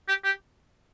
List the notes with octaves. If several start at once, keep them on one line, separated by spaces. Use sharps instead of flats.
G4
G4